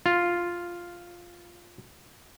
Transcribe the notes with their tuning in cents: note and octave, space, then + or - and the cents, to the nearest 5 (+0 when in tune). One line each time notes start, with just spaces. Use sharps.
F4 +0